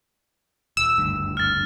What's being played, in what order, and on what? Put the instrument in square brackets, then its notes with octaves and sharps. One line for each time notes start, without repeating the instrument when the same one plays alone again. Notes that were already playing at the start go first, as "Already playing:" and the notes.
[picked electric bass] D#1 [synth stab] E6
[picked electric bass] F#1 D2 G2
[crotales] F6 A6